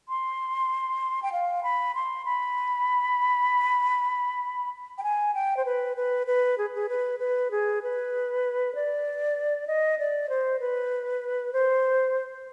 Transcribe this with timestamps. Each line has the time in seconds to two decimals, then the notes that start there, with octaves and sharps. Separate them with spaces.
0.09 C6
1.23 G5
1.33 F5
1.63 B5
1.95 C6
2.25 B5
4.98 G5
5.03 G#5
5.34 G5
5.57 C5
5.65 B4
5.97 B4
6.27 B4
6.58 G#4
6.75 G#4
6.89 B4
7.19 B4
7.51 G#4
7.82 B4
8.75 D5
9.67 D#5
9.99 D5
10.29 C5
10.60 B4
11.53 C5